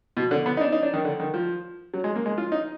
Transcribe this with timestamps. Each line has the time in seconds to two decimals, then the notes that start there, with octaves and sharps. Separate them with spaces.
0.17 B2
0.31 D3
0.46 B3
0.57 D#4
0.61 D4
0.72 D#4
0.83 D4
0.94 D#3
1.05 D3
1.20 D#3
1.34 F3
1.94 F#3
2.04 G#3
2.16 A#3
2.26 G#3
2.38 F4
2.52 D#4